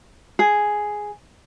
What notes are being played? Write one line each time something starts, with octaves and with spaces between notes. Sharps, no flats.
G#4